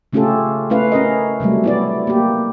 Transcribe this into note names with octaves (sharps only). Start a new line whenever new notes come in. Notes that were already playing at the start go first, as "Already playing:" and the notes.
C#3 A3 C#4 F4 G4 A4
A3 C#4 E4 B4 F5
C#4 A#4 D#5
C3 F#3 G3 A3
B3 E4 D5
A#3 G4